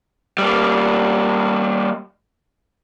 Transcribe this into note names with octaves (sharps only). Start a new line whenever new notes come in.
G3 A#3